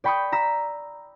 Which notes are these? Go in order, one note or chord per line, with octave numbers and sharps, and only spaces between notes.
D5 G5 B5 C#6 D#6 G6
A#5 E6 B6